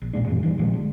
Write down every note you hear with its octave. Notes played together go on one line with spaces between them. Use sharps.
A#1
E1 A#2 G#3 D4
F#2 A#2 E3
D#3 E3 G3
A#1 A#2 F3 G#3
D3